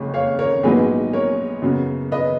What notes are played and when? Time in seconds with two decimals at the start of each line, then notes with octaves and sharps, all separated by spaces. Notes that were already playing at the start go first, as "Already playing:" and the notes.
Already playing: F#1 F2 C#3 G#3 C#4
0.14 C#5 F5
0.39 A#4 C#5
0.63 A#1 G#2 F#3 B3 D#4 G#4 B4
1.13 A#4 C#5
1.62 F#2 C#3 F#3 B3
2.12 B4 D#5